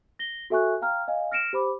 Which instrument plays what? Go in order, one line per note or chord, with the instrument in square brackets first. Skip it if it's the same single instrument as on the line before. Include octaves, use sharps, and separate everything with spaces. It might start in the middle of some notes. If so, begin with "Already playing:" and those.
[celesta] A#6 G7
F#4 A4 E5 G#5 C#6 F#6
F5 G5 A#5 F6
D#5 F5 G#5
F6 A#6 C#7 D7 E7
G4 C5 B5 D6